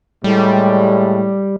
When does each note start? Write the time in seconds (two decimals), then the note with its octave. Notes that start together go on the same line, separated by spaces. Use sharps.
0.24 A2 G3 G#3